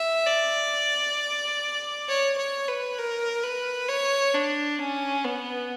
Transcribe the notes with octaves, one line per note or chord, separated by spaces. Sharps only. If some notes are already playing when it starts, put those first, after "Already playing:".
Already playing: E5
D5
C#5
C#5
B4
A#4
B4
C#5
D4
C#4
B3